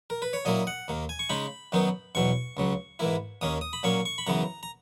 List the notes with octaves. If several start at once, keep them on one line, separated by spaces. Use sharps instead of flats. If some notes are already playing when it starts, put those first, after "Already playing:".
A#4
B4
C#5
A#2 F#3 A#3 E4 D#5
F#5
D#2 D#3 A#3
G#5
C#6
C#3 G#3 D#4 B5
F#2 D#3 F#3 B3 D#4
E2 B2 F#3 C#6
C#2 C#3 F#3
G#2 E3 A#3 E4
D#2 D#3 A#3 C#4 D#6
D#6
B5
A#2 F#3 A#3 C#4 C#6
C#6
B5
F#2 C#3 E3 B3 A#5
A#5